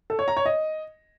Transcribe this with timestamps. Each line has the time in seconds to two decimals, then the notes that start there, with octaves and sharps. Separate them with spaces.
0.10 A4
0.19 C#5
0.28 A#5
0.37 C#5
0.46 D#5